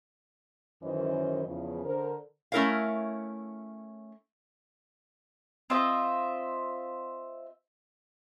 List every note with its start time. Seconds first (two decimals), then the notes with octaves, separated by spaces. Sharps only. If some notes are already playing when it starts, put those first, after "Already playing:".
0.83 F#2 D#3 E3 C#4 C5 D#5
1.45 E2 C#3 F3
1.85 D3 A#4 C5
2.52 A3 C#4 E4 A#4 C#5 F5
5.70 C4 F4 D#5 E5